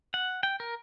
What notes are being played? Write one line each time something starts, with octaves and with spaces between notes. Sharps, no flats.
F#5
G5
A#4